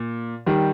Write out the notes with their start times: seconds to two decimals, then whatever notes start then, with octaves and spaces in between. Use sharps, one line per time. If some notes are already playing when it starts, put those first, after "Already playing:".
Already playing: A#2
0.46 D#3 G3